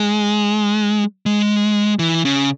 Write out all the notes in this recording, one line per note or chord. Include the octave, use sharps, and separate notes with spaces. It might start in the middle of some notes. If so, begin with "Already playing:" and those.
Already playing: G#3
G#3
E3
C#3